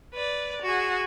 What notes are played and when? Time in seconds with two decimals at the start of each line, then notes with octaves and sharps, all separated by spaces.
0.14 B4 D5
0.62 F#4 G#4